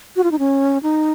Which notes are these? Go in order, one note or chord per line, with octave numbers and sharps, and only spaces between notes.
F#4
F4
D#4
C#4
D#4